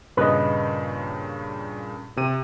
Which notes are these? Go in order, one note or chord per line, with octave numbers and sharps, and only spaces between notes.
G2 A#2 C#3 B4 D#5
C3 D#7